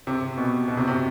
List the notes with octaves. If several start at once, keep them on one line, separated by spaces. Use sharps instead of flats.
C3
B2
B2
C3
C3